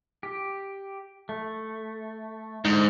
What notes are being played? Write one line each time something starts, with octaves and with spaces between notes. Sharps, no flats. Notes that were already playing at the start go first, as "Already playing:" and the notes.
G4
A3
G#2 D3 D#4